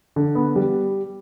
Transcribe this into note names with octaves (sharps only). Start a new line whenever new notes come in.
D3
B3
G3